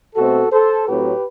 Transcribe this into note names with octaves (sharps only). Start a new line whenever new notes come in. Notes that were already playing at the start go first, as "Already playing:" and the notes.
B2 A3 C4 F#4 A4
A4 C5
A2 F#3 A3 C4 G4 B4